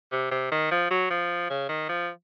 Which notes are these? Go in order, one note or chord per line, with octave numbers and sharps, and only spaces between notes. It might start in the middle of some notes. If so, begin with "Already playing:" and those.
C3
C3
D#3
F3
F#3
F3
C#3
D#3
F3